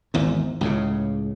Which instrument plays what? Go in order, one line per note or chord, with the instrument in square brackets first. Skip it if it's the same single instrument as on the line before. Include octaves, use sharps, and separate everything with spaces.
[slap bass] G#1 E2 G#2
C#2 A2 C#3